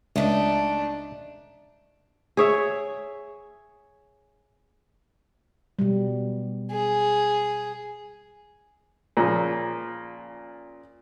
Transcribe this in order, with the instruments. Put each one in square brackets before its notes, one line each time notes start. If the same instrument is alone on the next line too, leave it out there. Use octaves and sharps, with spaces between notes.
[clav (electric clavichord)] C#2 [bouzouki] A3 D#4 [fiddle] D4
[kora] G#4 C#5 E5
[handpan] B2 G3
[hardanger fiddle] G#4
[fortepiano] A#2 C#3 F3